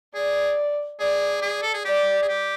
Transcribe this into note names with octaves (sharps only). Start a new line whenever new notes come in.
G#4 D5
G#4 D5
G#4
A4
G#4
G4 D5
G#4
G4